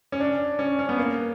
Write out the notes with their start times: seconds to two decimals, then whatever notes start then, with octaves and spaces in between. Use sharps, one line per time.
0.12 C#4
0.20 D4
0.59 C#4
0.79 C#4
0.89 B3
0.98 A#3